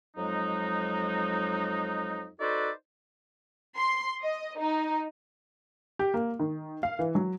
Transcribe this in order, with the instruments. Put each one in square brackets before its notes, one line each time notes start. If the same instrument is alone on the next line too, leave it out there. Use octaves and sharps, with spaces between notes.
[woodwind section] F2 F#3 G#3 D#4
D#4 F#4 A4 B4 C5 D5
[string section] C6
D#5
D#4
[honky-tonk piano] G4
A#3
D#3
F5
E3
F#3